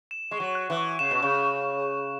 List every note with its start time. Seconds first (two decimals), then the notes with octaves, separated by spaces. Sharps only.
0.11 E7
0.31 G#3 C#6
0.40 F#3
0.55 F#6
0.70 E3
0.77 C#6
0.99 C#3 E7
1.11 B2
1.22 C#3 C#6